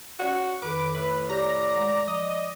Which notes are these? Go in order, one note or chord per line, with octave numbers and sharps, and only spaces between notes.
C#4 F#4 C#5 D5
F2 D#3 A4 B4 D6
A2 B4
G4 C#5 D5 A#5 G6
G#3
F3 D5 D#5